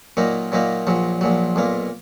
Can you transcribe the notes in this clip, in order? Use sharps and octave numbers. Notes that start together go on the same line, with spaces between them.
A#2 F#3 A#3 D#4
A#2 F#3 A#3 D#4
A#1 A#2 F#3
A#1 A#2 F#3
B1 A#2 A#3